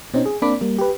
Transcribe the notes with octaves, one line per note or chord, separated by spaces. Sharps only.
B2 C4 C#4 D#4
G#4
A#3 C4 D4 B5 D6
G3 A#3
G4 B4